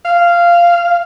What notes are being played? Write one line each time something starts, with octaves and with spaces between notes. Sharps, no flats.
F5